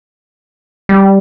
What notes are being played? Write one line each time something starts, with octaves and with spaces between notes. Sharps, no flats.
G3